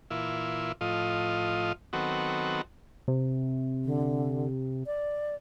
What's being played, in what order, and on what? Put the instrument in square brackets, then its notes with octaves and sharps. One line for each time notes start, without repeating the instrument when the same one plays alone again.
[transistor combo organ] A#2 E3 E4 F4
A2 F3 F4 D#5
D#3 F#3 B3 C4 F#4 A4
[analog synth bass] C3
[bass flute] D3
D5